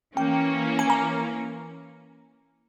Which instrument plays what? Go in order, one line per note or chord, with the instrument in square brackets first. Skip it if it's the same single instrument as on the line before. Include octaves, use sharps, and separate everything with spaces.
[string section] E3 A#3 C#4 [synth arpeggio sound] G5
[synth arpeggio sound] G#5
A#5